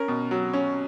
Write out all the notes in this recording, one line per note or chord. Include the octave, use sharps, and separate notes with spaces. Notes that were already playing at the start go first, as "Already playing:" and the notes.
Already playing: C#4 A#4
B2
F#3
C#4